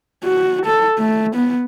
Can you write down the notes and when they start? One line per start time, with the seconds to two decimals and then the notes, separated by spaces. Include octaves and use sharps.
0.24 F#4
0.66 A4
0.98 A3
1.35 B3